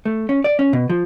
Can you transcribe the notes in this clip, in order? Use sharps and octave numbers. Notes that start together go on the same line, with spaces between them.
A3
C#4
D5
C#4
B2
F3